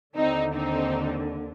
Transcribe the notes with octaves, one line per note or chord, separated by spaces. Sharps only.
D#2 D3 C4 D#4
C4 D#4